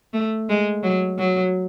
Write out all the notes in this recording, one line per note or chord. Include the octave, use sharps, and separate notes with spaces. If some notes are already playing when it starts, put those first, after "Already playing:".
A3
G#3
F#3
F#3